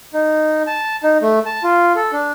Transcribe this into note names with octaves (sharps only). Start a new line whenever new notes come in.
D#4
A5
D#4
A3
A5
F4
A4
D4